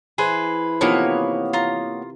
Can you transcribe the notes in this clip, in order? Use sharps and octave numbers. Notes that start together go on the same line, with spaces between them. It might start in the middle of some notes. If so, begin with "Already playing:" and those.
E3 G#4 B4 C5
C3 D#3 F3 A#3 B3 C#5
F4 A#5